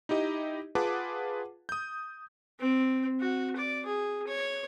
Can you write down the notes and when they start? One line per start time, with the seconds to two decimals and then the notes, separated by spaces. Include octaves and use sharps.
0.09 D#4 E4 G4 D#5
0.75 F4 G#4 B4 F#5 A5 D6
1.69 D#6 G6
2.60 C4
3.20 F#4
3.56 D5
3.85 G#4
4.27 C#5